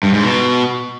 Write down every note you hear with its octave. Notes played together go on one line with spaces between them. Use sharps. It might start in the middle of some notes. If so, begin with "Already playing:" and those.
G2
G#2
B2